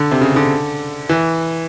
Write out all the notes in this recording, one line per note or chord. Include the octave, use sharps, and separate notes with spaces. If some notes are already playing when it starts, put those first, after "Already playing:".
Already playing: D3
C3
C#3
D3
E3